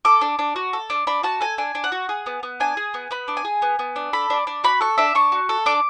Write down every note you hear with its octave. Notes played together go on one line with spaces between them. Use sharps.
A4 D6
D4
D4
F#4
A4
D4
D4 B5
F#4 A5
A4 G#5
D4 G#5
D4
F#5
F#4
G#4
B3
B3
D4 G#5
G#4
B3
B3 B5
D4
G#5
G#4
B3
B3
D4
A4 B5
D4
D4
F#4 B5
A4 C#6
D4 E5
D4 C#6
F#4
A4
D4 D6